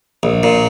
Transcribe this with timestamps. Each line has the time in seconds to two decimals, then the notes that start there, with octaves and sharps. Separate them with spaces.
0.23 A#1
0.43 A#2